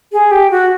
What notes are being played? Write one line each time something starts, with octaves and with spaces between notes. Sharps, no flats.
G#4
G4
F#4